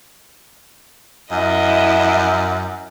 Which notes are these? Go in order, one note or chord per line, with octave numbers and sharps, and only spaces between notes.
F#2 E4 D#5